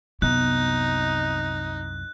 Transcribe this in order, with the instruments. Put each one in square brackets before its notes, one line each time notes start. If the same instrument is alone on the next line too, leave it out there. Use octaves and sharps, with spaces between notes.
[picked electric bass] C2 F#2 C3 [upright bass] B3 [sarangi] D#4 [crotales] F#6